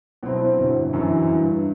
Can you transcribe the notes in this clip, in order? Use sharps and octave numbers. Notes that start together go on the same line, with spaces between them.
B2 F#3 C4 E4
G1
F#2 E3
G2